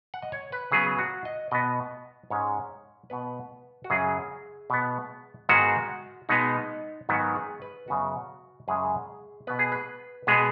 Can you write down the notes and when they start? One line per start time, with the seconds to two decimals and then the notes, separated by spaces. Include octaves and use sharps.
0.14 F#5
0.22 D#5
0.32 C#5
0.52 B4
0.72 C#3 F#3 B3 G#4
0.99 F#4
1.25 D#5
1.51 B2 B3 D#5
2.30 G#2 G#3 C#4 C#5
3.10 B2 B3 B4
3.84 F#4
3.90 F#2 C#3 F#3 G#4
4.70 B2 B3
5.49 G#2 D#3 G#3 B3 F#4
6.29 B2 G#3 B3 D#4
7.09 G#2 D#3 F#3 B3 F#4
7.35 G#4
7.62 B4
7.88 F#2 C#3 B3 F#4
8.68 F#2 C#3 G#3 G#4
9.47 B2 B3 B4
9.59 G#4
9.72 B4
10.27 B2 G#3 B3 G#4